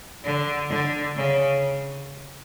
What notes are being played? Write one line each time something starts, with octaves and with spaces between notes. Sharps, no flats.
D3
D3
C#3